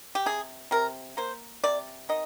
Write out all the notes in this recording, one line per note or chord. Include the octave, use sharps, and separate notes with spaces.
G4
C3 G#4
C3 A#4
A#3 C5
C3 D5
D#3 D#5